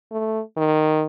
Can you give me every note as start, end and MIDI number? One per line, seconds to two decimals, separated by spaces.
0.11 0.40 57
0.57 1.06 51